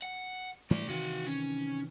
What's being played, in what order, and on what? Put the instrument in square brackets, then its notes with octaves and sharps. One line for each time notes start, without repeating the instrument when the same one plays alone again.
[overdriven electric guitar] F#5
[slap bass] G#2 E3 G3 [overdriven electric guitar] A3 D5
[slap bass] C3 D#3 E3 [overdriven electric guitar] F#4 F5
[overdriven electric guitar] C#4